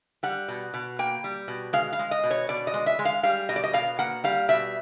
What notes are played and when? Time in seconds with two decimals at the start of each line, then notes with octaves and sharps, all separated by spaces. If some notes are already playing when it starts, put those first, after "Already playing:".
0.23 G3 F#5
0.48 B2
0.74 B2
0.99 A#3 G5
1.24 G3
1.48 B2
1.73 G#3 F5
1.93 F5
1.99 G#3
2.11 D#5
2.24 B2
2.31 C#5
2.49 B2 D5
2.67 D#5
2.74 G#3
2.86 E5
2.99 G#3
3.05 F5
3.23 G3 F5
3.49 B2 D#5
3.56 D5
3.64 D#5
3.73 B2 F5
3.99 A#3 F#5
4.24 G3 F5
4.49 B2 E5